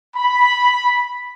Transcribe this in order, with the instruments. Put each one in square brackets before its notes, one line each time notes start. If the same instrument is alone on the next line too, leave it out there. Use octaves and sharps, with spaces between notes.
[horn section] B5